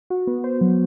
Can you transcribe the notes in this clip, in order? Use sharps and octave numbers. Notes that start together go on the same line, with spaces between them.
F#4
B3
C5
F#3